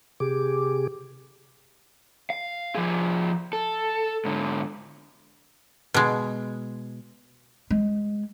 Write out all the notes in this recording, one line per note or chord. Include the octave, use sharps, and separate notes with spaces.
C3 G4 G#4 D6
F5
F3 G#4
A4
G#2 D3
B2 G#3
G#3